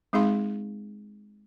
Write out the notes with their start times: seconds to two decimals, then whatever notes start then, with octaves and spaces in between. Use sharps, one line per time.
0.13 G#3 C4 D#4 G#4 F5 C6